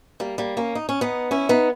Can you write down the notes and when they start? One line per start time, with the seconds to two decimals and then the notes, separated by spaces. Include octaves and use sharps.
0.20 G3 A#3
0.38 G3 A#3
0.57 A#3 C#4
0.75 D#4
0.89 C#4
1.01 B3 D#4
1.31 C#4 E4
1.49 B3 D#4